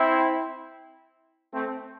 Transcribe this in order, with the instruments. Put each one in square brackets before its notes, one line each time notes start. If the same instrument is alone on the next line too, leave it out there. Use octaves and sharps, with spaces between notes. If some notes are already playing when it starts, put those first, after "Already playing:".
Already playing: [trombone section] C4 E4
A3 C4